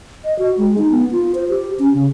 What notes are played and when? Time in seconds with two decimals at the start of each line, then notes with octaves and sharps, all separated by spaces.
0.24 D#5
0.39 F#4
0.58 G#3
0.78 D#4
0.91 B3
1.12 F4
1.35 C5
1.49 G4
1.79 C#4
1.94 C#3